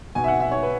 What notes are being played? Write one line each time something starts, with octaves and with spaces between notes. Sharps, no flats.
B2 G#5
E5
F#5
E5
C#5
B4